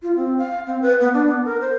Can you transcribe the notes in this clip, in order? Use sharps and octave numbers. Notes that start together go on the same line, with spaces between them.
F4
C4
F5
C4
B4
B3
D4
B3
A#4
C5